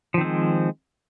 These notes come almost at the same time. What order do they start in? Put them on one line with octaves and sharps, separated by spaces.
F3 D#3 C4 G#3